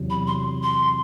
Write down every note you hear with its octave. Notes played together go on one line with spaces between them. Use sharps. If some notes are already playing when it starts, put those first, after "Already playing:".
Already playing: E2 C3 F#3
B5
C6
C6